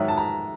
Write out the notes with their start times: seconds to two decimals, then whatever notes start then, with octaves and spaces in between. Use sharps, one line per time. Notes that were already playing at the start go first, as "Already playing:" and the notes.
Already playing: G#2 D#3 F#3 E5
0.08 A5
0.17 A#5